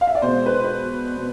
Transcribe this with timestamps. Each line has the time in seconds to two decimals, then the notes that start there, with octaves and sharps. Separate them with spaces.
0.01 F5
0.07 E5
0.15 D5
0.22 B2 G#3 C5
0.46 B4
0.55 C5
0.64 B4
1.17 B2